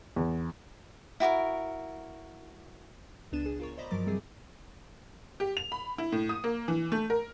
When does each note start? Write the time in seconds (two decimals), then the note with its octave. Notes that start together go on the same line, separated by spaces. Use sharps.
0.16 E2
1.20 E4 F#4 G4 A#4
3.32 C#2 B3 D4 D#7 E7
3.46 G#4
3.60 F4 A#4 C#5
3.77 C5 D5 D#5 A#5 B5
3.90 G2 F3 F#3 A#4 D6 A6
4.06 C3 G3 C4 G#4
5.40 G4
5.57 F7
5.72 B5
5.98 E4
6.12 A2
6.29 D#6
6.44 A#3
6.68 E3
6.92 A3
7.10 A#4